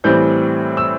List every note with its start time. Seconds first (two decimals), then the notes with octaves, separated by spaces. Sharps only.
0.04 A2 E3 G3 C4 G6
0.77 E6